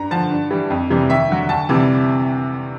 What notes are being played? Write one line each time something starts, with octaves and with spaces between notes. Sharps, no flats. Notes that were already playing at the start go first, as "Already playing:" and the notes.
Already playing: G2 A#5
D3 F3 A5
G2
E3 G3
F2
C3 E3 G3
D#2 E5
D3 F#3
D2 A5
C3 E3 G3